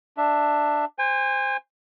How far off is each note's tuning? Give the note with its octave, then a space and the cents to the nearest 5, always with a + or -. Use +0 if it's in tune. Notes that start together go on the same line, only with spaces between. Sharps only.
D4 +10 E5 +0
C5 -5 G#5 -35